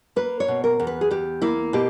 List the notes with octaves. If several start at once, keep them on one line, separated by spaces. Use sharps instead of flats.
A#3 B4
C#5
B2
A#4
E2
B4
G#4
E2 G4
A#3 E4
B2 G4